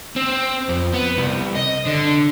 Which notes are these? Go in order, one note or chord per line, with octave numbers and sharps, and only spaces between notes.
C4
F2
B3
C2
D#5
D3